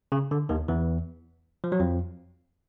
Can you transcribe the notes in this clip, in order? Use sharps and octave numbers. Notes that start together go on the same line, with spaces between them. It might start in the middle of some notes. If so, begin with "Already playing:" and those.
C#3
D3
D#2 D#3
E2 E3
F3
F#3
F2 F3